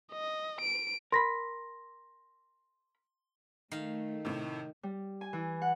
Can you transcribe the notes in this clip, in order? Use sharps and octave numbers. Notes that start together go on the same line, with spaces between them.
D#5
D7
A#4 B5 C6 A#6
D#3 A3 F5
A2 C3
G3
G#5
E3
F#5